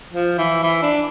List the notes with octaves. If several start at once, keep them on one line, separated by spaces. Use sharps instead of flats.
F3
E3
E3
D4